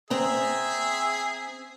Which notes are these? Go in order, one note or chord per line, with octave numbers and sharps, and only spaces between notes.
C4 G#4 E5 A#5